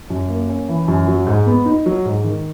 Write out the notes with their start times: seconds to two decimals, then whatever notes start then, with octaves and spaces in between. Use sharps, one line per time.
0.10 F#2
0.29 A#3
0.49 C#4
0.69 E3
0.88 F#2
1.08 F#3
1.27 G#2
1.47 B3
1.66 D#4
1.86 F#3
2.05 G#2
2.24 D#3